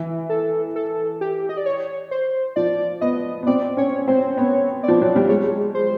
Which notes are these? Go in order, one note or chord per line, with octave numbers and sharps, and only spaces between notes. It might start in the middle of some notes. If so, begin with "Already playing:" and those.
Already playing: E3
A4
A4
G4
D#5
D5
C#5
C5
F3 D5
B3 D#5
B3
C4 D5
C#4 C#5
C4 C5
B3 C#5
D5
F3
F#3
G3
G#3 C#5
C5